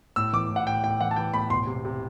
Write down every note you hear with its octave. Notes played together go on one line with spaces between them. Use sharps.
A2 E6
E3 D6
A2
F#5
A2 G5
A2 G5
E3 F#5
A5
E3 G5
A2 B5
E1 C6
C3
C3